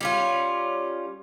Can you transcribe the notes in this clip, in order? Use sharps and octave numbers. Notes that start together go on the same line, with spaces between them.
G3 C#4 F4